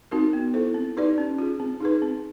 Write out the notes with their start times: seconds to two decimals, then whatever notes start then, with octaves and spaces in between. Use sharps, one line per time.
0.11 C4 D#4 F#4 A#4
0.33 B3
0.54 E4 A4 C5
0.74 C4
0.97 D#4 G4 B4 D5
1.18 C#4
1.39 F4 G#4
1.60 C4
1.80 D#4 G#4 B4
2.02 C4